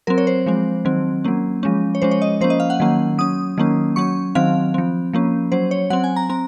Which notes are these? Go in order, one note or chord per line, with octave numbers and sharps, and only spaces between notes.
F#3 C4 A#4
C#5
C5
F3 G#3 C4
D#3 F#3 C4
F#3 A#3 C#4
F3 G#3 C#4
C#5
F3 G#3 C#4 C5
C#5
D#5
F3 A#3 C#4 C5
D#5
F5
F#5
D#3 F#3 A#3 C#4
F#3 C#4 D#6
D#3 F#3 A#3 C#4
F#3 C#4 C#6
D#3 F#3 C4 F5
F3 C4
F3 A#3 C#4
F#3 C#4 C5
C#5
F#3 C4 F#5
G#5
A#5
C4 A#5